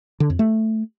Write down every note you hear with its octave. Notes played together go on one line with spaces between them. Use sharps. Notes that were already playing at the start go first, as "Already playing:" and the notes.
D3
F2
A3